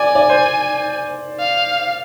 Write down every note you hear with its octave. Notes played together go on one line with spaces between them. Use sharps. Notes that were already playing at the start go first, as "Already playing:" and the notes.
Already playing: D5 G#5
D5
C5
F5